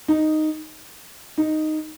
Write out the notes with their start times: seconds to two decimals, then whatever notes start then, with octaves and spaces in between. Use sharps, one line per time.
0.08 D#4
1.38 D#4